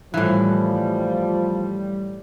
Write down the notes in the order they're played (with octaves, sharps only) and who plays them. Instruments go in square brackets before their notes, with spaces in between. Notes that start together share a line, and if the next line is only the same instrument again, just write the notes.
[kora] A2 E3 [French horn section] F3 [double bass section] G3